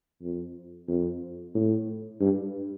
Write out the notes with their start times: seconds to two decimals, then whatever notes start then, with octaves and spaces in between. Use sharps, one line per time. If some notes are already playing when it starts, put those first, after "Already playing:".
0.22 F2
0.88 F2
1.55 A2
2.21 G2